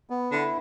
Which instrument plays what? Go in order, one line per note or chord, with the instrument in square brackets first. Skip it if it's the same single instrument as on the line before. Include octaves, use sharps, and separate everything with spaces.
[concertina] B3
[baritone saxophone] D3 [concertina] E4